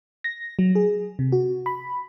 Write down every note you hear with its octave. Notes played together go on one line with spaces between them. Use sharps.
A#6
F#3
G#4
C3
F#4
B5